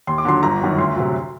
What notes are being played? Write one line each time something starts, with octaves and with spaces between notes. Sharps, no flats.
D#2 C6
D6
D3 F#3 C6
G1 A#5
F#2 D#3 F#3
D2 C6
C3 F#3